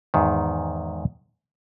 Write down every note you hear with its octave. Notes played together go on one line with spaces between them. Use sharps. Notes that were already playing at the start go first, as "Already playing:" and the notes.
E2 G#2 D#3